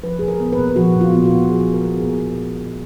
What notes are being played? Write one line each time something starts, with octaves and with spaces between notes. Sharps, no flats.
F3 B4
A#2 G#4
A#4
B3
B4
A#2
F3 F#4
A#2
F4
B3
F#4
A#2
F3 G#4
A#2
A#4
B3
G#4
A#2